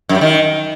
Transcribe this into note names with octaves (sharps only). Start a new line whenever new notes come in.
F#2
G3
D#3